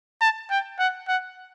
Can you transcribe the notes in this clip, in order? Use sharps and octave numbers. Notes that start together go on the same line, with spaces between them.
A5
G5
F#5
F#5